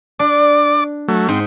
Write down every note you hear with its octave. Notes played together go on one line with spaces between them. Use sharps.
D4 D5 D6
F#3 A3
G#2 C4